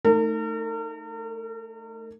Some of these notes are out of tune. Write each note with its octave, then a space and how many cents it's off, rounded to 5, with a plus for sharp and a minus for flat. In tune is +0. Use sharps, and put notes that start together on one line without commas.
A3 +0 D#4 +0 A#4 -45